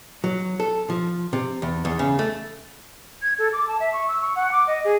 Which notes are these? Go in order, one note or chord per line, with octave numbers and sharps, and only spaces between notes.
F#3
A4
F3
C3
E2
E2
C#3
A3
G#6
A4
D6
A5
E5
C#6
E6
C#6
F#5
D6
D#5
G#4